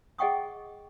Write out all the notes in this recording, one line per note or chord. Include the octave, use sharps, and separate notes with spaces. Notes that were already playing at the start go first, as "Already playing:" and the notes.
G#4 D#5 F#5 G5 C#6 D#6